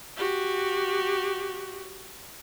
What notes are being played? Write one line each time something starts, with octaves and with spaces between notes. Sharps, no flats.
F#4 G4